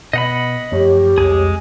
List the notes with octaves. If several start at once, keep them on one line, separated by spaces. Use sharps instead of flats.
B2 D#5 F#5 B5
F#2 F3 A3 G4 C#5
C2 F2 G#3 G#4